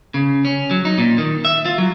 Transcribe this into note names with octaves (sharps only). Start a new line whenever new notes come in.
C#3
C#4
F#3
D#4
A#2
D#3
E5
F4
F#3